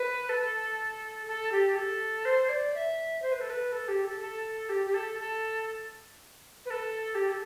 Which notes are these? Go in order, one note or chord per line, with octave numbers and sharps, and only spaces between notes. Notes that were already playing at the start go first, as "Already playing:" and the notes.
Already playing: B4
A4
A4
G4
A4
C5
D5
E5
C5
B4
A4
B4
A4
G4
A4
A4
G4
G4
A4
A4
B4
A4
G4
A4